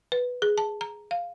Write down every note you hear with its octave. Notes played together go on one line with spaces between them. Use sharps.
B4
G#4
A5
A#5
F5